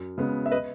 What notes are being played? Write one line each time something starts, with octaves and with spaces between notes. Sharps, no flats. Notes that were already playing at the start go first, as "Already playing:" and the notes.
Already playing: F#2
C#3 G#3 B3
E5
B4 D#5